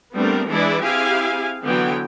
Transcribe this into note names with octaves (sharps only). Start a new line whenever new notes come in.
G3 A3 B3 C4 D4 A#4
E3 G#3 D4 E4 B4 D5
C4 E4 G4 G#4 F5 G#5
D3 E3 F#3 B3 G5